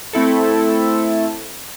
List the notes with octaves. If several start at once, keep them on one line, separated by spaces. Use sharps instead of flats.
A3 C4 E4 A4